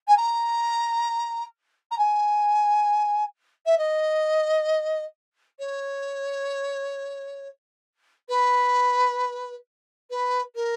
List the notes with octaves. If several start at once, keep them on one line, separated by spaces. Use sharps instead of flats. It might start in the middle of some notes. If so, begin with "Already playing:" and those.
G#5
A#5
A#5
G#5
E5
D#5
C#5
B4
B4
A#4